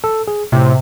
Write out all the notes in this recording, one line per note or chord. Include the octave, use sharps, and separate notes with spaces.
A4
G#4
A2 C3